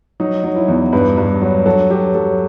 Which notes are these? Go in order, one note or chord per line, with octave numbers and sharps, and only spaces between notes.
F#3 D#4
F#3
E4
E2
G2 B4
G2
F#3
F#3 A4
F#3 G4
F#3 A4